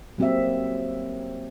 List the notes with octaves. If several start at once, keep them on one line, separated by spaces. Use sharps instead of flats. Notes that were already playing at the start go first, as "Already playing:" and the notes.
F#3 A#3 C4 G4 D#5 E5